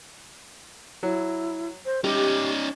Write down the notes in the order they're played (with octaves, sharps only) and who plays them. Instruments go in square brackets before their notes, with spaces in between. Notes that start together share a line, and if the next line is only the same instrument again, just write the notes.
[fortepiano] F#3 [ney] E4
[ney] C5
[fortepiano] G3 [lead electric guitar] C#4 D#4 [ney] G4